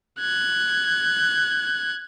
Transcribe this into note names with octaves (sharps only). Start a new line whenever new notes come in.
F#6 G#6